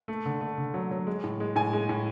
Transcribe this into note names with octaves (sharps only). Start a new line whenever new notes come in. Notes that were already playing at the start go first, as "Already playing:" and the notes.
A3
D3
A3
D3
F#3
F#3
G#3
A2
G#3
A2 G#5
G#3
A2